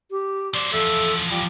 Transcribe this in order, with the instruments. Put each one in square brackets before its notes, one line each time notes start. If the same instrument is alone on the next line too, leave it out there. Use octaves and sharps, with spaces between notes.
[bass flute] G4
[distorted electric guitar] F#3 C5 [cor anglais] D5
[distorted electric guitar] E2 F3 [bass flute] A4 [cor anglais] E5
[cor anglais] G3 [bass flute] F4